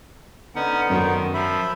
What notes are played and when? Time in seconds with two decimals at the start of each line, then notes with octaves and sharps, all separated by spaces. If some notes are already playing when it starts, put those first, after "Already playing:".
0.55 D3 B3 C#4 D#4 F#5
0.90 F#2 D#3
1.34 F3 E5 B5